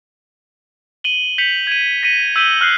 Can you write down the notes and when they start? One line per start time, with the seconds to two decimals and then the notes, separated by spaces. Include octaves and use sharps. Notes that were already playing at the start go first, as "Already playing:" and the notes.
1.04 D#7 F#7 G7
1.38 G6 B6 C#7 F7 F#7
1.67 G#6 D#7
2.03 A#6 B6 C#7 D#7 F#7
2.36 E6 G6 B6 D#7 F#7 G7
2.61 F6 F#6 C7